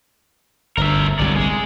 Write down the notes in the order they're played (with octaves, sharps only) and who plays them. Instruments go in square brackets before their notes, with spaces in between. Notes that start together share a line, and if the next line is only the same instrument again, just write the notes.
[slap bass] G1 D2 [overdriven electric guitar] A#4 E5
[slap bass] G1 C2 [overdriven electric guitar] F#3 D5
[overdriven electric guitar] G#3 G#4